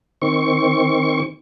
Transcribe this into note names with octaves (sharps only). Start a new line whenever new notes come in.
D#3 C4 C#6